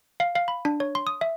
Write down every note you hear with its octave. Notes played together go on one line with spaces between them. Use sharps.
F5
F5
B5
D4
C#5
C6
D#6
E5